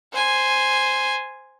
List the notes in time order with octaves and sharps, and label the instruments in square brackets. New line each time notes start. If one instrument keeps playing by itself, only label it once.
[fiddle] C5 G#5